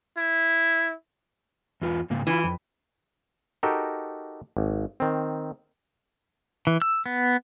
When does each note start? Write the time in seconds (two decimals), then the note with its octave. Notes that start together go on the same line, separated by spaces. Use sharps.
0.17 E4
1.82 E2 F4 B4
2.10 G#2 C#3 A#3
2.27 E3 E4 F4
2.44 F2
3.63 D#4 F#4 G4 A4 A#4
4.57 G#1
5.00 D#3 C4
6.67 E3
6.82 E6
7.06 B3